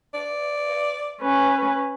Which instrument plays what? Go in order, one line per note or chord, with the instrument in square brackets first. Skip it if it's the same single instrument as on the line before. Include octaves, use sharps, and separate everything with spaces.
[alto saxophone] D5
[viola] C#4 B4